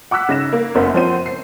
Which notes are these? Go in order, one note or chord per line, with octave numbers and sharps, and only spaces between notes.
F#5 D6 E6 F#6 B6
C#3 D#4 A#6 E7
A#3
F#1 F#2 B3 A#4 C5 E5
F3 C4 C#4 C5 F#5 D#7
C7